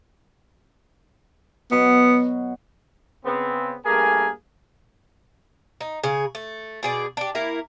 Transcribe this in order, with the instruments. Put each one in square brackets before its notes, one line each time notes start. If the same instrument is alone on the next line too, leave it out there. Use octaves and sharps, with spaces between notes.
[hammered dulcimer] B2 F#3 F#5 [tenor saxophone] B3
[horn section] C#3 B3 C4
G2 A3 A#3 G#4 A#4 G#5
[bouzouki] D#4
C#3 G#4
A3
B2 G#4 D5
D4 G4
A#3 E4 A#4